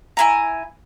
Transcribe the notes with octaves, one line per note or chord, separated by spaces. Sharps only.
E4 G#5 A#5